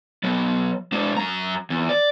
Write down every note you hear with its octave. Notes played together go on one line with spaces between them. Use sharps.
F#3 B3
G#3 D4
F#2 A#5
E2
D5